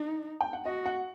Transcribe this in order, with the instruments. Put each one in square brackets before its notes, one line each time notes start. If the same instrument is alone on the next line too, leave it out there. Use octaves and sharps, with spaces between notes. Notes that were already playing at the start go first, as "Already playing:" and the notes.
Already playing: [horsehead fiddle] D#4
[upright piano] G5
F#5
[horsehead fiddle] F#4 [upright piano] D#5
[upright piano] F#5